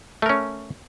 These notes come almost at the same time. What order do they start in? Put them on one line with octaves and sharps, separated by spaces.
A3 A#4 C#4